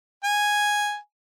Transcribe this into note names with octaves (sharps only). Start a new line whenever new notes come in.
G#5